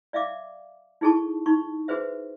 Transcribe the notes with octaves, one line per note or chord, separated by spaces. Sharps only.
D5 E5 F5 D6
D#4 E4 G#4 A4 A5 C#6
D#4 C#6
F#4 G#4 B4 C5 E5